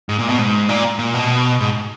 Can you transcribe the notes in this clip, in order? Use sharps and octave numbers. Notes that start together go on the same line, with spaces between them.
G#2
A#2
B2
G#2
A#2
A#2
B2
G#2